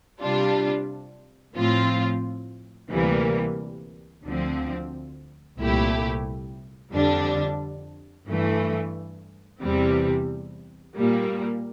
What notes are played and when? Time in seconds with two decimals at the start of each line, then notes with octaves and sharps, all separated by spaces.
0.22 C3 G3 D4 F4
1.55 A2 F3 C4 F4
2.89 D2 C3 E3 G3 A#3
4.25 D2 D3 F3 C4
5.59 C2 A#2 A3 E4 G4
6.92 F2 D3 G3 D4
8.28 G2 E3 A3
9.61 E2 C3 E3 G3 C4
10.97 A#2 G3 A#3